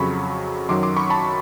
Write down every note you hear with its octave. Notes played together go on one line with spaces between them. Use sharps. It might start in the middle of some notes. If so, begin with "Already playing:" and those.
Already playing: F2 C#3 F#3 B5 C#6
F#2 D#3 F#3 C6 D6
C6 D6
B5 C#6
A5 B5